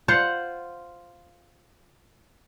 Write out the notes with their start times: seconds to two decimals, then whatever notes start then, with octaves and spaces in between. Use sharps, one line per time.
0.08 F4 C5 F#5